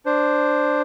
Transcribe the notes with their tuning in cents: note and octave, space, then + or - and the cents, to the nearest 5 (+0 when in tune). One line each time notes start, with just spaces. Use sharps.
D4 +5 C5 +0